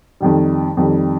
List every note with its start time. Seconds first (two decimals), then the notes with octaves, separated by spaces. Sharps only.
0.20 F2 D#3 G3
0.77 F2 D#3 G3